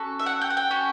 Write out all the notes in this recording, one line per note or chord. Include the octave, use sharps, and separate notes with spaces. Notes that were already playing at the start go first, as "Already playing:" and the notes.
Already playing: C#4 F#4 A4
E5
F#5
G5
F#5
G5
C#4 F#4 A4